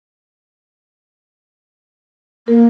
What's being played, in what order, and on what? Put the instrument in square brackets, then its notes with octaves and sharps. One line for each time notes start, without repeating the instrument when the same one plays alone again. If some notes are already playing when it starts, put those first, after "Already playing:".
[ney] A#3 [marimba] A#4